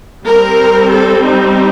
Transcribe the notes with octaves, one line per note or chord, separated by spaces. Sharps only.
G3 C4 A#4
A4
D#4